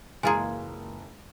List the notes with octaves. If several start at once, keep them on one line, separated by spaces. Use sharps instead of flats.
F#1 E3 G#3 A#3 F4 G#4 G#5 A#5